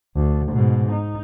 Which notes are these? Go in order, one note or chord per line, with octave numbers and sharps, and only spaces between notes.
D2
G#2 B2
D#4